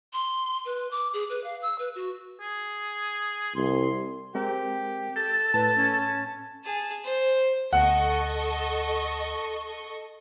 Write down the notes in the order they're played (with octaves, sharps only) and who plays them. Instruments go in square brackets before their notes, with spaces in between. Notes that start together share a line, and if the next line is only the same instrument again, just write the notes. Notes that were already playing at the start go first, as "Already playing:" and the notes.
[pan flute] C6
B4
D6
G#4
B4
F5
E6
B4
F#4
[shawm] G#4
[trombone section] C2 [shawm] C6
[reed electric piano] G#3 C4 A#4 [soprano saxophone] G4
[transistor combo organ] A4 [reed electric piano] G6
[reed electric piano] A2 [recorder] B4 [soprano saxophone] A5
[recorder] C#4
[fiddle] G#4 A5
C5
[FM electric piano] D2 [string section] A4 D#5 C#6 [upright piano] F#5